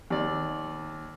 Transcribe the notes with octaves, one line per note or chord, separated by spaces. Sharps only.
D#2 D5